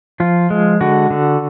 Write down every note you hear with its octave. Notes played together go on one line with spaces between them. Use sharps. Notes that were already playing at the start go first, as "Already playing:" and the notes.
F3 F4
G#3
D3 F#4
D3